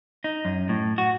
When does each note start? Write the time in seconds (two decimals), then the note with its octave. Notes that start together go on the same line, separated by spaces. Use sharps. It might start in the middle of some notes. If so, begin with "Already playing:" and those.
0.24 D#4
0.45 F#2
0.69 A2
0.98 F#4